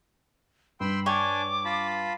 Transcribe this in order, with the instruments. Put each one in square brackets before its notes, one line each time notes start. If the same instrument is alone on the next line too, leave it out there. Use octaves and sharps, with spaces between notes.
[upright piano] G2 [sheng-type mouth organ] G5 C6 E6 [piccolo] B5
[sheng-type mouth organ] D4 G#5 [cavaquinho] C#5 G5 [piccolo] D6
[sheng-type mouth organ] F4 A5 B5